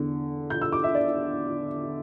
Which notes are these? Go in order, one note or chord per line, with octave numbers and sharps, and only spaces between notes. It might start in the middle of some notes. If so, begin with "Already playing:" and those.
Already playing: E2 D3
G6
E6
D6
E5
D5